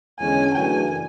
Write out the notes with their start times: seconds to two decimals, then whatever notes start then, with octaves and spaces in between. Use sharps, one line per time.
0.19 E2 D3 G#3 C#4 G#5
0.54 F#2 C#3 E3 A3 D4 G#5